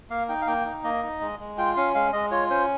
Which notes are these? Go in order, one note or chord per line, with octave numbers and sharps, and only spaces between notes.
A#3 F5
D#4 G5
F5
A#3 G5
D#4
A#3 D#5
D#4
G#3
G#3
F4 G5
C#4 F5
G#3 F5
G#3 D#5
F4 C#5
C#4 C5